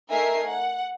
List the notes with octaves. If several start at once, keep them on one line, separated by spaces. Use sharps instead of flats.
A3 D#4 A#4 E5 G#5 C7
F#5